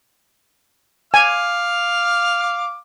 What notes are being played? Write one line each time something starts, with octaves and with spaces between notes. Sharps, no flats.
F5 G#5 D6 F6